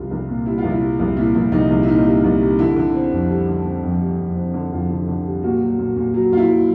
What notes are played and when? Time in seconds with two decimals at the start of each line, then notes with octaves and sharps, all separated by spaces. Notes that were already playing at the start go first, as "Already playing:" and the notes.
Already playing: C2 G3 F4
0.11 C2
0.29 A#2
0.46 G3 E4
0.58 F4
0.64 C2
0.70 E4
0.82 G3
0.99 C2
1.16 A#2 E4
1.34 C2 E4
1.52 C2 D#4
1.70 C2
1.83 E4
1.87 A#2 D#4
2.06 G3
2.24 C2
2.41 G3
2.59 D3 E4
2.76 D3
2.94 C4
3.12 F2
3.30 G3
3.48 D3
3.65 C4
3.83 F2
4.01 G3
4.19 F2
4.36 C4
4.54 D3
4.72 F2 F4
4.90 D3
5.08 D3
5.26 G3
5.43 A#2 F#4
5.62 F#3
5.79 A#2
5.96 A#2
6.14 F#3
6.32 A#2 F4
6.37 E4
6.49 F#3